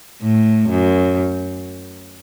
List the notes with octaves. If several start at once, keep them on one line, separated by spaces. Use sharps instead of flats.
A2
F#2